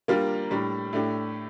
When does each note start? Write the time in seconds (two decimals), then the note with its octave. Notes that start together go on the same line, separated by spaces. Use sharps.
0.08 G3 A#3 D4 F4 A#4
0.51 A2 G3 D4
0.93 A2 A3 D4 G4